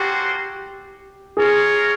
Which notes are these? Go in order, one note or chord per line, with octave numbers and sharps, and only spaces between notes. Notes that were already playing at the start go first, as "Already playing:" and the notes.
Already playing: A#3 C#4 F#4 G4 A4 C5
F4 G#4 A#4 C#5